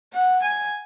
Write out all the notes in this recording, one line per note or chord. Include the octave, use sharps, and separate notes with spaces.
F#5
G#5